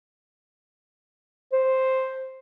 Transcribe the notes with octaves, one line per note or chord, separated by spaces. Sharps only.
C5